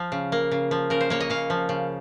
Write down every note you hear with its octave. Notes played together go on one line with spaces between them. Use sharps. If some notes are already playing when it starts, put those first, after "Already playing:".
Already playing: F3 F5
C#3
A#3
C#3
F3
C#3 A#4
C5
A#3 C#5
D#5
C#3 F5
F3
C#3